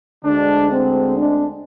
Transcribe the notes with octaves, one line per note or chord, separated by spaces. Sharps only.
D2 D3 G#3 D4
C4
D4